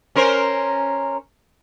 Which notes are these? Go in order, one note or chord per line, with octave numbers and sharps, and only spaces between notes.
C#4 A#4 C5